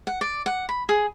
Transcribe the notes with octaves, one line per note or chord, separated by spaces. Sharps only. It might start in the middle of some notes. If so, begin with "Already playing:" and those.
F#5
D5
F#5
B5
G#4